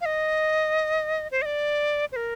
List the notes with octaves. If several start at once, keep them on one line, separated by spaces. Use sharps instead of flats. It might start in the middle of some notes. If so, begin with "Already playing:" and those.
F5
D#5
C5
D#5
D5
C5
A#4